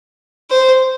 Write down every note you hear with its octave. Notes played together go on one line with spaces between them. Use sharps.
C5